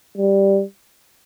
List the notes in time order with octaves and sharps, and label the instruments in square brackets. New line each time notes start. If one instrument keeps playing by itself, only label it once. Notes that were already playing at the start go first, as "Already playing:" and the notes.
[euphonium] G3